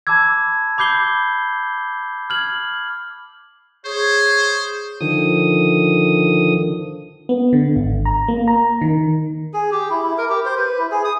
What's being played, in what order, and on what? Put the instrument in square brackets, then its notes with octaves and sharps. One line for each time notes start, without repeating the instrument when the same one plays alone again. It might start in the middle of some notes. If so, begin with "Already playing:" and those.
[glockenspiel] A5 B5 D6 E6 G#6
B5 D6 G6 C7 G7
F6 G#6 F#7
[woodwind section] G#4 C#5 [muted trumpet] C5
[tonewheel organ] D3 D#3 F3 D#6
[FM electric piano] B3
D3
G#1
A#5
A#3
A#5
D#3
[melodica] G#4
G4
E4
E4
A#4
G4
C5
B4
E4
G#4
D#6